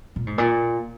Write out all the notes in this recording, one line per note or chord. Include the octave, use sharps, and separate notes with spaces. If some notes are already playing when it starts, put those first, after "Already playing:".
A#2
G#2
A#2